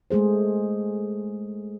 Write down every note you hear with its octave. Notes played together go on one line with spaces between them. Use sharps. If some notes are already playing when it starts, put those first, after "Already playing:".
G#3 A3 G#4 C5